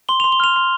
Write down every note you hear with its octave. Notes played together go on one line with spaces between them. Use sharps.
C6 G7
F7
C6
G7
F6 F7
C6